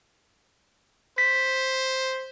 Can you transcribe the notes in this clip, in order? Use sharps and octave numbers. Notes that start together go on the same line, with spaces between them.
C5 B6